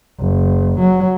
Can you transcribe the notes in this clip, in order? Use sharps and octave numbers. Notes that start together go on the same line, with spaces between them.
F#1
F#3